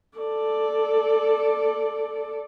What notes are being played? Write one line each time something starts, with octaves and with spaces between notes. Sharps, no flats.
A4 D5